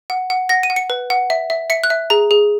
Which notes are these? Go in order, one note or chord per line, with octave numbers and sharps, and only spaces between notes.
F#5
F#5
F#5 A#6
D#7
F#5
C#7
B4
F#5
E5
E5
E5 C#7
F#6
E5
G#4 A#5
G#4